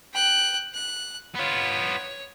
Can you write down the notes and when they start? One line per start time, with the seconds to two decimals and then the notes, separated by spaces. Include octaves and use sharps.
0.13 G5 F#6
0.74 F#6
1.35 B3 F4 C#5